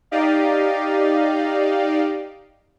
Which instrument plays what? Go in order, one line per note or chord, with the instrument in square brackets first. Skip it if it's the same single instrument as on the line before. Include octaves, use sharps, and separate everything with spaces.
[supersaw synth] D#4 G4 D5 D#5 F5